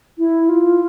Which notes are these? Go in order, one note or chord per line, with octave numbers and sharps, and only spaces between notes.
E4
F4